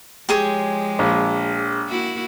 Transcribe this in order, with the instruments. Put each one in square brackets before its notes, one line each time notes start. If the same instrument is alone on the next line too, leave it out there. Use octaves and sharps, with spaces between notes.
[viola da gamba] F3 G#3 [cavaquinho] G4 G#4 C#5
[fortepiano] A#1
[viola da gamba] A#3 E4 F#4